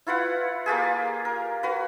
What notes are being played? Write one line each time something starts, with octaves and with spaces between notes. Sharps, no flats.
E4 F4 B4 F#5
A#3 F4 G4 G#4
A#4
F#4 B4